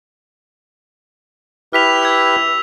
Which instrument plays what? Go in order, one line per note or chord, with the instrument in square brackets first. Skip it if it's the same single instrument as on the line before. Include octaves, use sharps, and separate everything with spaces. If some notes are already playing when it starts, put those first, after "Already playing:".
[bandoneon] E4 G4 B4 [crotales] F6 B6 F7
[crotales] E6 G#6